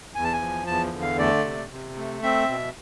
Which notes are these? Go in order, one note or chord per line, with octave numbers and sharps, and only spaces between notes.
E2 G#5
A5
G#5
F3
E2 A5
D3
F5
A3 D5
C3
C3
A3
C4 E5
B2